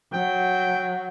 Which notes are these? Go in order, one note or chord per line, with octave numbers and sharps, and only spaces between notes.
F#3 G5